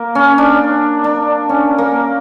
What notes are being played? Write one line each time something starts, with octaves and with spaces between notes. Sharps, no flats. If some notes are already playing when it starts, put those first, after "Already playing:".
Already playing: A#3
C#4
D4
D4
C#4
A#3